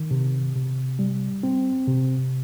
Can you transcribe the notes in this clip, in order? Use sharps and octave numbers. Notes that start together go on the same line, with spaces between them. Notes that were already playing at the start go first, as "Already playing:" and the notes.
Already playing: D#3
C3
C3
G3
C4
C3